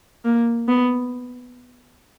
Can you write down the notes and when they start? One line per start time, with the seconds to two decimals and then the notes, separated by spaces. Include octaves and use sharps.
0.25 A#3
0.68 B3